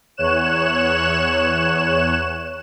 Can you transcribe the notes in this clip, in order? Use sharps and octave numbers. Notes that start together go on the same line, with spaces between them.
E2 C#5 F#6 E7